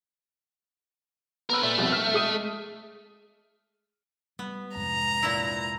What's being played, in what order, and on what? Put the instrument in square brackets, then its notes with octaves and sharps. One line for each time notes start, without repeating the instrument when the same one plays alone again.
[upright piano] B3 E6 [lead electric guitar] A#4 B4
[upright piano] A#2 [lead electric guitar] A3
[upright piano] F1 C2 B2
F6 B6
G#3 D#6 D#7
[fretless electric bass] G3 G#3 [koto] B3
[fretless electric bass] C2 F2 G#2 [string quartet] A#5
[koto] A#2 E4